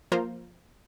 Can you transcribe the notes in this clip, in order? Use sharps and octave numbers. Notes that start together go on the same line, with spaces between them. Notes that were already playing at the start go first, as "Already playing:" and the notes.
F3 A#3 F4 A#4 C5